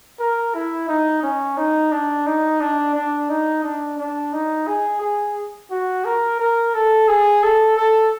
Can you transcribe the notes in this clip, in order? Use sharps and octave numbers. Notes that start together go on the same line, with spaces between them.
A#4
E4
D#4
C#4
D#4
D4
D#4
D4
D4
D#4
D4
D4
D#4
G#4
G#4
F#4
A#4
A#4
A4
G#4
A4
A4